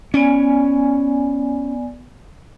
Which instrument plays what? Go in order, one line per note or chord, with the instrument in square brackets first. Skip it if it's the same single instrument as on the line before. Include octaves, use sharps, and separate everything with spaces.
[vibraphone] B3 D5 G#5 [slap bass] C#4